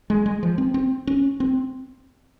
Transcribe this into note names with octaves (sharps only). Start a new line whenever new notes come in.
G#3
G#3
F3
C4
C4
C#4
C4